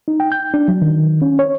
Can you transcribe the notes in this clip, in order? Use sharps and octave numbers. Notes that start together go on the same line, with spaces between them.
D#4
G5
G6
D4
F#3
D#3
C#4
C#5